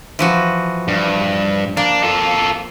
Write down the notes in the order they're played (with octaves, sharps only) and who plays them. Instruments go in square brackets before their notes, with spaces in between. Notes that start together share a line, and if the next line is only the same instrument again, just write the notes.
[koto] E3 F3 F#4
[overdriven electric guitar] G2
[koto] A#3 [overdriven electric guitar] D4
[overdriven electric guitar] F4 A4